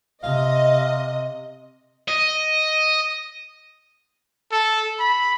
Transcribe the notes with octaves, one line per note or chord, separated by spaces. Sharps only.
C3 D#5 F5
D#5
A4
B5